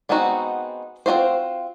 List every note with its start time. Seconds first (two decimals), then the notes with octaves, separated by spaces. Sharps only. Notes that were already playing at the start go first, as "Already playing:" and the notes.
0.09 G#3 B3 C4 D#4 F#4
1.06 C4 C#4 F4 F#4 C5